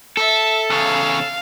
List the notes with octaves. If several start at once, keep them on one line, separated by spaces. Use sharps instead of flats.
A4 E5
E2 C#3 F5